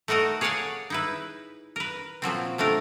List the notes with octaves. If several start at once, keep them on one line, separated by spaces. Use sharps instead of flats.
A3 D#4 F#4 A#4 D#5
G#4 C#5 D5 F5 F#5 G#5
D#4 E4 B4
A#4 B4
A#2 F3 F#3 C4
C3 A3 D4 A#4